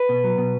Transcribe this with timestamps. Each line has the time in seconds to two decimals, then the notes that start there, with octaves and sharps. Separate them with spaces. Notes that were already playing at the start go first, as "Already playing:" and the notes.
Already playing: B4
0.09 B2
0.24 F#3
0.38 B2